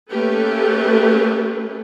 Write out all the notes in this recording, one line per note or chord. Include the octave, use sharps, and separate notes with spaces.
A3 A#3 C#4 G4 A4 B4